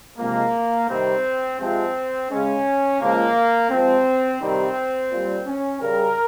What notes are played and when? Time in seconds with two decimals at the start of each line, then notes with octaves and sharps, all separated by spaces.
0.18 C3 F3 G#3 A#3
0.88 C3 D#3 G3 C4
1.59 C3 F3 G#3 C4
2.30 C#3 G#3 C#4
3.00 C#3 F3 G#3 A#3
3.71 C3 F3 G#3 C4
4.41 C3 D#3 G3 C4
5.12 A#2 G3
5.47 C#4
5.82 C#3 G3 A#4